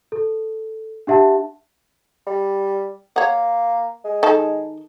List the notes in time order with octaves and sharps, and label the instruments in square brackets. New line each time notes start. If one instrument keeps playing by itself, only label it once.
[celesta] A4
D4 G4 E5 F#5 A5
[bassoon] G3
[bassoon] A#3 [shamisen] C#5 F#5
[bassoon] G#3
[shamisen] D#3 A4